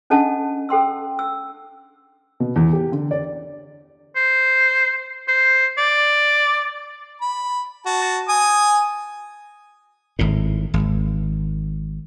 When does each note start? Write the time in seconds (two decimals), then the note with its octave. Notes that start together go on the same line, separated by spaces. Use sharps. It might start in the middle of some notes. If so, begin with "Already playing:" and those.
0.10 C#4 D4 A4 D#5 F#5 A5
0.69 A4 G5 C6 E6
1.19 E6
2.40 B2
2.56 E2
2.73 G4
2.92 D3
3.11 D5
4.16 C5
5.28 C5
5.78 D5
7.22 B5
7.86 F#4 A5
8.29 G#5 D#6
10.19 G#1 A2
10.74 G#1